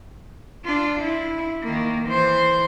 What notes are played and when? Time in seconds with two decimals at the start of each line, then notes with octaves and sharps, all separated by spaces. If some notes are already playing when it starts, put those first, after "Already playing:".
0.65 D4 F4
1.00 E4
1.63 D#3 A#3
2.07 E3 C5